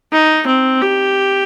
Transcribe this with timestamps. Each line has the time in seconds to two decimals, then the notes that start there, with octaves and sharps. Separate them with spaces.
0.12 D#4
0.47 C4
0.81 G4